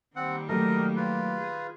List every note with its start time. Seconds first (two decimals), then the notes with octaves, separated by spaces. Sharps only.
0.16 D#3 G3 A#3 C4 F#5
0.49 F#3 A3 A#4 D#5
0.96 F4 B4
1.37 G#4